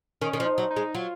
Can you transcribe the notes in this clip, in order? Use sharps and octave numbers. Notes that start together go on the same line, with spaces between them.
D#3 C#4
D#3
F3
D#4
F#3
D#4
G#3
F#3 F4